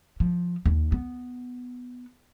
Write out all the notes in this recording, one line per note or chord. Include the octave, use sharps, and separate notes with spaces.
F3
D#2
B3